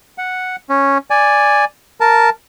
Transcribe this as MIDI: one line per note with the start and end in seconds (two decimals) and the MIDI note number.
0.18 0.56 78
0.69 0.98 61
1.10 1.65 74
1.10 1.65 80
2.00 2.30 70
2.00 2.30 81